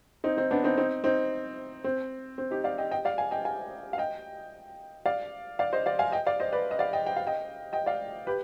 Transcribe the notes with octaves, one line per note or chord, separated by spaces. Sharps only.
C4 D#4
C4 D#4
B3 D4
C4 D#4
C4 D#4
C4 D#4
C4
C4
D#4 G4
D5 F5
D#5 G5
D#5 G5
D5 F5
F5 G#5
D#5 G5
F5 G#5
F5
D#5 G5
D5 F5
D5 F5
C5 D#5
D5 F5
F5 G#5
D#5 G5
D5 F5
C5 D#5
B4 D5
D#5
D5 F5
D#5 G5
G5
F5
D#5 G5
D#5 G5
D5 F5
G4 B4